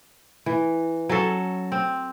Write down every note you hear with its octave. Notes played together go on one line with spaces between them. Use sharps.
E3
F#3 C#4 A4
C4